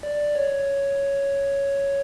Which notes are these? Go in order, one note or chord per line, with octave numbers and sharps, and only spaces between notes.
D5
C#5